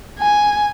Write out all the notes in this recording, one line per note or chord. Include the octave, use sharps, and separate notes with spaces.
G#5